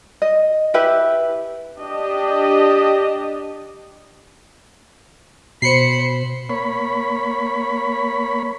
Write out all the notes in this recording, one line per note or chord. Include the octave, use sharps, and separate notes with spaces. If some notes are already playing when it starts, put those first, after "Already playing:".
D#5
E4 G4 B4 E5
D4 G4 D#5
B2 C5 B5 C7 C#7
A#3 C#5 B5